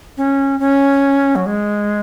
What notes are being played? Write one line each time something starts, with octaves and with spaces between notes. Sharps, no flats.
C#4
C#4
F#3
G#3